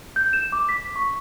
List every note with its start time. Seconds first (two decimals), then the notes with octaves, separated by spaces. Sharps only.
0.16 G6
0.33 E7
0.52 D6
0.69 B6
0.96 C#6